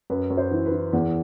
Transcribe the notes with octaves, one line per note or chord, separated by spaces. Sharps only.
F#2 B4
F#2
C5
E3
B4
E3
E2